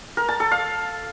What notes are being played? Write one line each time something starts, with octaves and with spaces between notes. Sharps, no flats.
A#4
A5
A4
F5